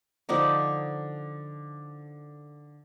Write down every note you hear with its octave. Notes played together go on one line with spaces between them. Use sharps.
D3 F3 D4 D#4